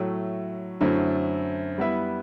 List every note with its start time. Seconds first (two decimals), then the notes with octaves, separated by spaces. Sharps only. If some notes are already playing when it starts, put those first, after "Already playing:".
Already playing: A2 F#3 A3
0.81 F#2 D3 A3 C4 E4
1.78 G3 B3 E4 B4 E5